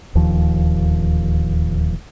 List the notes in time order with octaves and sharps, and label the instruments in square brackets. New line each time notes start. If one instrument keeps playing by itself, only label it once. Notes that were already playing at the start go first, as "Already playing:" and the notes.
[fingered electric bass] D1 D#2 F3